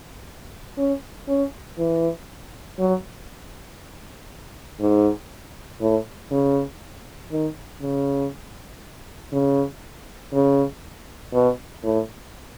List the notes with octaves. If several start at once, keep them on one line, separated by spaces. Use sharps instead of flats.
C#4
C#4
E3
F#3
G#2
A2
C#3
D#3
C#3
C#3
C#3
B2
A2